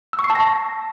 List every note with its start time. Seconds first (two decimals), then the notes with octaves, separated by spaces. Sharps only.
0.13 E6
0.19 C#6
0.24 C7
0.30 A5
0.35 A#6